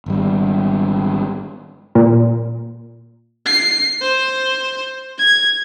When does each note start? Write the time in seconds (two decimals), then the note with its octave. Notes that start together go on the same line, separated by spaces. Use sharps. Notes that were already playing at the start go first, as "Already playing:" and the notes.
0.06 G#1 G3
1.95 A#2
3.46 C7
4.02 C5
5.18 G#6